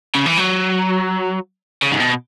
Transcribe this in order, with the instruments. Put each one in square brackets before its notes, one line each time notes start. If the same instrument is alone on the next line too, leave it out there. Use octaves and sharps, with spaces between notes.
[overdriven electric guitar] C#3
E3
F#3
C#3
G#2
B2